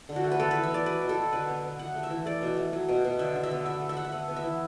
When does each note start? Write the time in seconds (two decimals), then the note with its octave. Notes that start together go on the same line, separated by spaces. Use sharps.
0.09 D3
0.16 F#4
0.24 A3
0.32 B4
0.40 B3 A4
0.51 E3 B4
0.63 E5
0.70 B3 D5
0.86 F#3 B4
1.01 B2
1.09 A4
1.17 F#3
1.33 D3 B4
1.49 B3
1.64 B3
1.79 A3 F#5
1.95 A3
2.03 E5
2.10 E3
2.26 A3 D5
2.42 B2
2.57 A3
2.73 F#3
2.89 B2
3.05 B2
3.19 D3 E5
3.35 D3
3.43 E5
3.51 B3
3.66 A3 E5
3.81 A3
3.89 E5
3.97 A3 F#5
4.05 E5
4.12 B3 F#5
4.28 B3
4.36 E5
4.43 E3